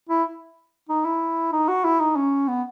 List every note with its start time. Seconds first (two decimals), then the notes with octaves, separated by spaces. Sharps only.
0.09 E4
0.89 D#4
1.05 E4
1.53 D#4
1.68 F#4
1.84 E4
2.00 D#4
2.16 C#4
2.48 B3